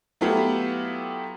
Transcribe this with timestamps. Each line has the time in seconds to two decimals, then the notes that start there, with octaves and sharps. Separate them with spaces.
0.21 F#3 A3 B3 E4 F4 G4